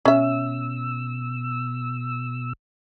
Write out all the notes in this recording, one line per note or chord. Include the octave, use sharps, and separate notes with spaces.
B2 C#4 E5 E6